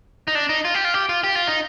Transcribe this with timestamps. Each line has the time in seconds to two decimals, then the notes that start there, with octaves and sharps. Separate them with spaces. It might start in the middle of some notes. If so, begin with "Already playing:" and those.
0.28 D#4
0.35 D4
0.49 D#4
0.65 F4
0.74 G4
0.85 F4
0.94 G4
1.09 F4
1.24 G4
1.35 F4
1.47 D#4